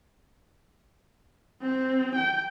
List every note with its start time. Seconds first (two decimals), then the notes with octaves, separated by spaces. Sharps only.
1.62 C4
2.16 G5